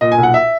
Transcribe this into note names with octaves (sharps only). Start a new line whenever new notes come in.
A#2 D#5
G#5
B1
F#5
E5